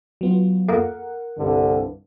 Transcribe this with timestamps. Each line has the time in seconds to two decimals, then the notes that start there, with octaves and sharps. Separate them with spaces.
0.21 F#3 B3 F4
0.69 F2 A#3 A#4 F#5
1.37 C2 G2 D3